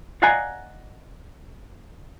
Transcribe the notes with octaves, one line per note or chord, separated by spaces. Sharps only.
D5 D#5 F5 F#5 G#5 A#5